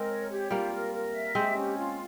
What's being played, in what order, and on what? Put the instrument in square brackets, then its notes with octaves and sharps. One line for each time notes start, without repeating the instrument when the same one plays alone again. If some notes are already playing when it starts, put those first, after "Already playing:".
Already playing: [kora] G#3 C4 [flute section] A#4
[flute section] C#5
G4
[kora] G3 A#3 [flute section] F4
[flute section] A#4
A#4
E5
[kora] G#3 C4 [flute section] G4
[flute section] C#4
F4